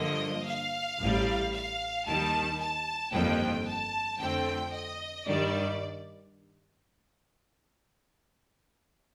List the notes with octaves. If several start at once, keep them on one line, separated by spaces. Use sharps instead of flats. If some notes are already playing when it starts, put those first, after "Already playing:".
Already playing: G2 D3 F3 A#3 D#5
F5
A1 A2 G3
F5
D#2 D#3 G3 A5
A5
G1 F2 D#3 G3 A#3 G5
A5
F2 D3 A3 C4 G5
D#5
G2 D#3 G3 D5